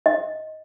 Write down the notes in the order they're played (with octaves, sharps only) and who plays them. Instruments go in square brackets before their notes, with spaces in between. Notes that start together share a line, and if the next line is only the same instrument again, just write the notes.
[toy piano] D#5